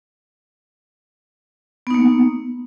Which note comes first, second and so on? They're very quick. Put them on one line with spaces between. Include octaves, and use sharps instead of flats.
B3 D#4 A#3